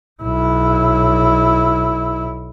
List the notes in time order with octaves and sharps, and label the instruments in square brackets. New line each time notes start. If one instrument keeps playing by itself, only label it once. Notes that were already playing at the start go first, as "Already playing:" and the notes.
[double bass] B1 E4